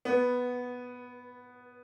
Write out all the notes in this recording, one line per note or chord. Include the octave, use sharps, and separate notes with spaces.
B3